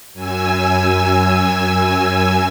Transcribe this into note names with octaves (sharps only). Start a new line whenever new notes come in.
F#2 G#5 E6